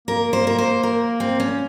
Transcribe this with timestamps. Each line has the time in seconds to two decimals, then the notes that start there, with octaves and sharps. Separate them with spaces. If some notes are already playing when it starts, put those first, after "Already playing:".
0.08 A#3 A#4
0.33 C5
0.47 A#4
0.58 C5
0.83 A#4
1.20 C4
1.40 C#4